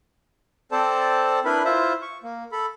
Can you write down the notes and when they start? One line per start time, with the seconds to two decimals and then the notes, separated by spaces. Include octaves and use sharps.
0.72 C4 A4 C5 D5 A5
1.45 D4 E4 A#4 B4 B5
1.65 E4 F4 C5 E5
2.02 C#6
2.23 A#3
2.52 A4 B5